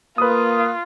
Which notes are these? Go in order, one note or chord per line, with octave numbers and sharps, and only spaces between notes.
A#3 F4 B4 D#6